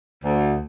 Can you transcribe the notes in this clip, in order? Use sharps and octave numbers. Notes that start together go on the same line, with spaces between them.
D2